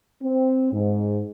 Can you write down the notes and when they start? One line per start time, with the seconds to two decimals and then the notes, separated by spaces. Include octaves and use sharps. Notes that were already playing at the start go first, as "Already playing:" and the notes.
0.23 C4
0.73 G#2